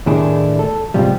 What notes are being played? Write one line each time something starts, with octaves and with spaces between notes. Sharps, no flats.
D#2 A2 D#3 D4 E4 G#4
A4
G#2 C3 F3 G3